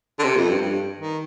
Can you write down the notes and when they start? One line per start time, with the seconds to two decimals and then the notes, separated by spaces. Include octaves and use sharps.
0.19 D3
0.24 C3
0.36 F2
0.50 G2
0.61 G2
0.99 D#3